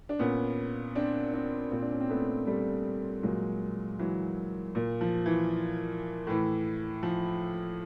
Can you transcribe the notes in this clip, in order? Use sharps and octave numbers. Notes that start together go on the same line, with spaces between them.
D4
A#2 B3 C#4
C4 D4
C4 D4
A#2 A#3 C4
D4
C#4
C4
A3 B3
G3 A3
A#2 F#3 G#3
E3 F#3
A#2
F3
E3
A2 E3
F3